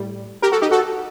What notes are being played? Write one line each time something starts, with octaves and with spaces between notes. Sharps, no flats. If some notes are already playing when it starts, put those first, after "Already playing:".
Already playing: A2 G3
G4 A#4
F#4 A4
D#4 G4
F#4 A4